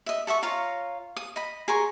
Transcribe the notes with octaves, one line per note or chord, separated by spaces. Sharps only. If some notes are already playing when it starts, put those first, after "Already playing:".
D#5 E5
A4 E5 F#5 C#6
F4 C#5 F5 A#5
D#6
D#5 B5
G#4 A#4 C6 C#6